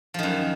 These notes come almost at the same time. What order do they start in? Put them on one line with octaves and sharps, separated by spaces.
F3 D#3 F#2